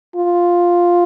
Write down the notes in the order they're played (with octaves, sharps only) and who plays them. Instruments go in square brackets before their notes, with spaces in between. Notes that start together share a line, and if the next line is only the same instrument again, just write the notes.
[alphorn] F4